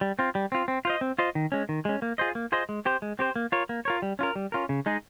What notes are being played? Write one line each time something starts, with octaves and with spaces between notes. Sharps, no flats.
G3
C4 F4
G3
C4 F4
C4
F4 C5 D#5
C4
F4 C5 D#5
D#3
G#3 C#4
D#3
G#3 C#4
A#3
F4 G#4 C5 D#5
A#3
F4 G#4 C5 D#5
G#3
C4 G4 C5
G#3
C4 G4 C5
A#3
F4 A#4 C#5
A#3
F4 A#4 C#5
G3
C#4 F4 A#4
G3
C#4 F4 A#4
C#3
G#3 D#4 G#4